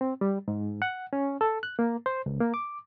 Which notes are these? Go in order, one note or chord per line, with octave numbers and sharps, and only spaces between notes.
C4
G3
G#2
F#5
C#4
A4
F#6
A#3
C5
C#2
A#3
D6